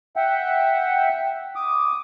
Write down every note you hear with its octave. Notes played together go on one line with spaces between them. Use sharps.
E5 F#5 G5
D6 D#6